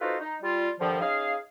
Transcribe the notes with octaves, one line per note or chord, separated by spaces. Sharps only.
D#4 F4 F#4 A4 B4 C5
D#4
G3 F4
G2 D3 D#3 F3
C#4 D#4 G#4 F5